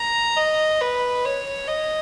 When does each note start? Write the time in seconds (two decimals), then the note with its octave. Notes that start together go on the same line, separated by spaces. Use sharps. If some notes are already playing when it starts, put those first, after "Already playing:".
Already playing: A#5
0.36 D#5
0.81 B4
1.25 C#5
1.68 D#5